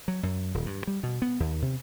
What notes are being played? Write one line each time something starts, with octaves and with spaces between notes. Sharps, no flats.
F#3
F#2
D#1
G2
G3
B2
B3
D#2
C3